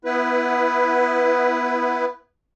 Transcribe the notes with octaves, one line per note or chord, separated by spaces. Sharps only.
B3 E4 B4